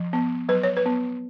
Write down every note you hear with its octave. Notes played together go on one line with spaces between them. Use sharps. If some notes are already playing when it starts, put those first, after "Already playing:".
Already playing: F3
B3
F#3 B4
C#5
B4
B3